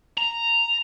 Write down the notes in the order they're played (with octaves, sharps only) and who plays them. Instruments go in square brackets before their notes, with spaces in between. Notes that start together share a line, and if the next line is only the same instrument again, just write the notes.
[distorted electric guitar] A#5